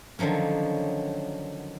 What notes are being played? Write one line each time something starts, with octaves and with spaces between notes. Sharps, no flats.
D3 D#3 F3 F#3 C#4